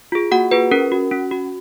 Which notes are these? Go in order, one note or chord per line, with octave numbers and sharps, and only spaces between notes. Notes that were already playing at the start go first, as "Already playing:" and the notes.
F4 G#4
A#3 F#4 F#5
F4 G#4 B4
C#4 A#4
F#4
C#4
F#4